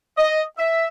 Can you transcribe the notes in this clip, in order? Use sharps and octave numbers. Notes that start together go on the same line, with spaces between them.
D#5
E5